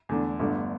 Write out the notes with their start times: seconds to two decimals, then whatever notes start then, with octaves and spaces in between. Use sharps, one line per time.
0.09 E2 D3 A3 D4
0.39 G1 G2 D3 A3